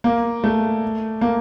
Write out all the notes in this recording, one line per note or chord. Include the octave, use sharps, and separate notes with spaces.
A#3
A3
A#3